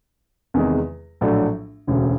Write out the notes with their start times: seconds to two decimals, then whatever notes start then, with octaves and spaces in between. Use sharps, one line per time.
0.54 E2 C3 D#3 G#3
1.21 A#1 A2 F#3 A3 D4
1.87 E1 D2 C#3